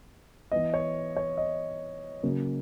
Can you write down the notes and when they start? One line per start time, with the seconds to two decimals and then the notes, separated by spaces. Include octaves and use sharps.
0.52 E3 B3 D#5
0.74 C#5
1.16 C#5
1.37 D#5
2.23 C#3 F#3 A#3